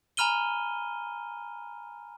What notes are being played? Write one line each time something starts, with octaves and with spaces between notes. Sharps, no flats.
G#5 A#5 B5 F6 D#7 G7